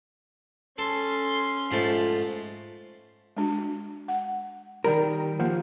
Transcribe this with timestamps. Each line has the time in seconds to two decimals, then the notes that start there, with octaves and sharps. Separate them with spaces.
0.78 C#4 A4 C6
1.71 G#2 F3 A3
3.37 G#3 D4 F#4
4.08 F#5
4.84 D#3 G3 A#4 B5
5.40 F3 A#3